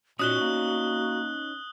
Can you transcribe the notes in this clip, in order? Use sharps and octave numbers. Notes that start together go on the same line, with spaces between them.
A#2 C#4 D#4 F#4 D#6 F#6 G7
A#3